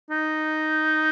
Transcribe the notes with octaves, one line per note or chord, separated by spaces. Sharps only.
D#4